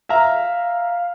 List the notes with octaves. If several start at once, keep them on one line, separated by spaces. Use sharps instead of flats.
E5 F5 A#5